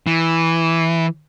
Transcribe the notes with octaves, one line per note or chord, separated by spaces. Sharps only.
E3